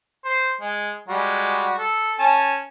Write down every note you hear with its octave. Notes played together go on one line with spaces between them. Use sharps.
C5
G#3
G3 G#3 F#4
A4
C#4 A5